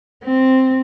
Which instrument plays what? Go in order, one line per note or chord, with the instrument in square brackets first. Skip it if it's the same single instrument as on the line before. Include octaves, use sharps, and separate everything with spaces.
[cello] C4